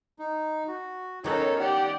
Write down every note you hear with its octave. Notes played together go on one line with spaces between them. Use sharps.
D#4
F#4
D#3 B3 C#4 D#4 A4 A#4 C#5
G4 D5 F#5